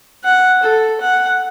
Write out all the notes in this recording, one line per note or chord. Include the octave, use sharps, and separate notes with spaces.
F#5
A4
F#5